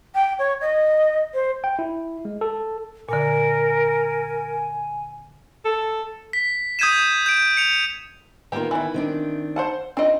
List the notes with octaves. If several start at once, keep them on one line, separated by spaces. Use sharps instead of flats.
G5
C#5
D#5
C5
G5
E4
G#3
A4
A#2 D3 A#4 G#5
A4
B6
D#6 G6 G#6 B6 D#7 E7
G6 D7
C#7 F7
D#3 A#3 B3 F4 G4
D#3 E3 E4
D#3 C4 D4
C5 F#5 A5
C4 D4 D#4 F4 D#5